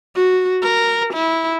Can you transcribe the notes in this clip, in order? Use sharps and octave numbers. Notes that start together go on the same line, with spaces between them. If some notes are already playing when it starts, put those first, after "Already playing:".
F#4
A#4
E4